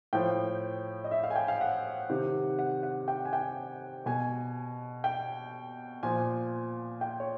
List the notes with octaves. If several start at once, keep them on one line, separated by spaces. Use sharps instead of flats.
A2 F3 G5
D#5
E5
F5
G#5
G5
F5
F#5
C3 D#3
F#5
F#5
G5
G#5
G5
B2 G#5
G5
A#2 F3 G#5
G5
C#5